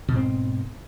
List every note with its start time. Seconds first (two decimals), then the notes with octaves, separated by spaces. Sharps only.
0.09 B2
0.12 G#2
0.15 C4